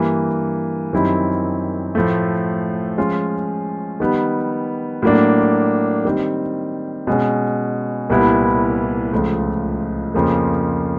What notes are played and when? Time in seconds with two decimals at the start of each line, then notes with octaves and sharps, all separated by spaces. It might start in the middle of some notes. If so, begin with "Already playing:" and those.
Already playing: G2 E3 G3 A#3
0.93 F#2 D#3 G3 C4 E4
1.95 A2 F3 A3
2.98 F3 G#3 C#4 F4
4.00 D#3 G3 B3
5.02 A2 F#3 A#3 D4
6.05 D#3 G3 C4
7.07 B2 G#3 C#4
8.10 C2 A#2 G3 B3 E4
9.12 C#2 C#3 F3 A3
10.14 F2 C#3 F3 A#3